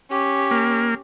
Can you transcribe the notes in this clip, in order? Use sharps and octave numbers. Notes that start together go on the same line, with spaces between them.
C#4 G4
A#3